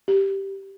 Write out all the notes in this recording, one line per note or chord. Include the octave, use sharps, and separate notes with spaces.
G4